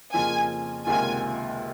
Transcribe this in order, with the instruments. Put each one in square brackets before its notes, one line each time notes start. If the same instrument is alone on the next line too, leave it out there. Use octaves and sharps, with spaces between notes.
[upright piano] F2 C#3 F3 A#3 F4 [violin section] G#5
[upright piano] C#2 C3 D#3 A#3 F4 [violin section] G#5